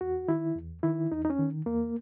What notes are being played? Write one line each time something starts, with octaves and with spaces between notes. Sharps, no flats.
E2 F#4
D#3 E4
E2
D#3 E4
E2 D#4
D#4
C#4
D#3
E2 A#3